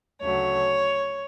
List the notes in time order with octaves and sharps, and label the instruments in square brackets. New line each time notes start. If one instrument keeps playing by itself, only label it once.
[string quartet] D2 C#3 F#3 A3 C#5